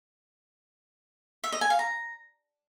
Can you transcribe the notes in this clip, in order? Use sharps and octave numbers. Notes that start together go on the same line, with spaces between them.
E5
D#5
G#5
F5
A#5